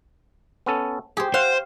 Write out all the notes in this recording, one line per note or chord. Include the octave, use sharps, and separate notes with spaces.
B3 C#4 A4
G4 G#4 C5
C5 F5 F#5